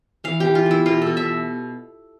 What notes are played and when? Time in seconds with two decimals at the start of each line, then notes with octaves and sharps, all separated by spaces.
0.24 E3 F5
0.40 E3 G4
0.55 F4
0.66 B3 E4
0.86 B2 F4
1.02 B2 A4
1.17 E5